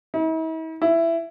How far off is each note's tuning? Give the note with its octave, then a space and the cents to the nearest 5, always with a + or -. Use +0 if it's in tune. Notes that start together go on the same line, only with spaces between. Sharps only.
E4 -45
E4 +15